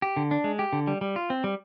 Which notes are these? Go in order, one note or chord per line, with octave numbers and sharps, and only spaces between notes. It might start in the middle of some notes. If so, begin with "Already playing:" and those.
G4
D3
D4
G#3
G4
D3
G3
G3
F4
C4
G3